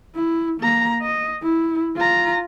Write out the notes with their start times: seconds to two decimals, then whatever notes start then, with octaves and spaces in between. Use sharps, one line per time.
0.16 E4
0.61 A#3 A#5
1.02 D#5
1.43 E4
1.96 F4 A#5